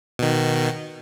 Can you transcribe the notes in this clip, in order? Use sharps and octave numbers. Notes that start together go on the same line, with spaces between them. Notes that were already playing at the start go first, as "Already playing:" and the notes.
B2 D#3